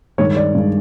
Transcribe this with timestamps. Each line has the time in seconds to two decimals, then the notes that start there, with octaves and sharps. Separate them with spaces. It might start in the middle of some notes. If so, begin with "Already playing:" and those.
0.18 G2 D#3 G#3 C#5
0.36 D5
0.55 G2 D#3 G#3